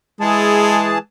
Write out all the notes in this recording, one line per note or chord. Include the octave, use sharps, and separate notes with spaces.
E3 G#3 G#4 A5